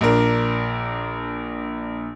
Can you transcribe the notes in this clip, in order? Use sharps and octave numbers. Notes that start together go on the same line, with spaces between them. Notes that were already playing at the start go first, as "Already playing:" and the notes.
A#1 D4 A#4